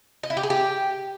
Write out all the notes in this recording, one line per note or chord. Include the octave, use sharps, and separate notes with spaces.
D#5
E4
G4
G#4
G4